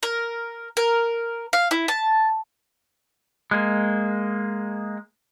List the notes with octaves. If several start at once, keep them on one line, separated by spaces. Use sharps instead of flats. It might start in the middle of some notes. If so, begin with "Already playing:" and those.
A#4
A#4
F5
E4
A5
G#3 A#3